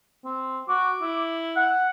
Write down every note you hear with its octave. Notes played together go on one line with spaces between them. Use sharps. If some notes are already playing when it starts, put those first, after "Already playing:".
C4
F#4 D6
E4
F#5